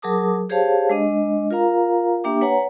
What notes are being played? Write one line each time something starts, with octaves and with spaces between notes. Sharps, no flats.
F#3 G#4 A#4 A5 D6 D#6
G4 G#4 C5 C#5 F5 A5
G#3 D4 D#5
F4 A#4 F5 A#5
A#3 D4 G4 E5 G5 D6
B4 C#5 F#5 G#5 A#5